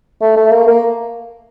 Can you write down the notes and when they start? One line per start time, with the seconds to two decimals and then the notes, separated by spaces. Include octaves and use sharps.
0.21 A3
0.37 A3
0.51 A#3
0.67 A#3